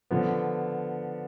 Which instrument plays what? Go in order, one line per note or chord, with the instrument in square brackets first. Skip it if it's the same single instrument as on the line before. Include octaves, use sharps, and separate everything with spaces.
[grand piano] D3 F3 B3